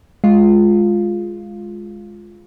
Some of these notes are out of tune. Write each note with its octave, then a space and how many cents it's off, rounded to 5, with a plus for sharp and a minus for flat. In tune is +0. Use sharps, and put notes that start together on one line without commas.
G#3 +0 F4 +0